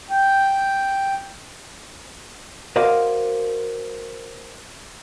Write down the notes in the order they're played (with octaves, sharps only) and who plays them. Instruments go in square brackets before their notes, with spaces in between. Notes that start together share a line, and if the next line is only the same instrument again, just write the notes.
[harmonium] G5
[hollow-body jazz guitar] F#4 A#4 C5 D5 D#5 F5